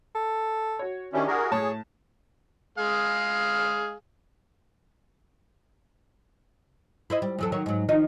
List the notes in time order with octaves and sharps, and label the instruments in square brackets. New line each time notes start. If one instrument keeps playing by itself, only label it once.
[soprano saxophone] A4
[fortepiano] F#4 C#5
[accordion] D#3 C#4 [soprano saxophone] D4 [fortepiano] E4 G4 E5
[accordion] F#4 G#4 A#4
[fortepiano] A2 A5 [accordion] G#4 [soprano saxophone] C#5
[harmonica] G#3 G#4 F5
[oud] E4 C5 D#5
G3
E2 F#3 A4
D#3 F#3 C#5
G#2 F#3
D#3 F3 D#4